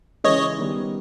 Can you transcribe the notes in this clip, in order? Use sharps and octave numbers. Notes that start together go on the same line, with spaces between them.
C#3 E3 G#3 C#5 D#5
D#3 G3 B3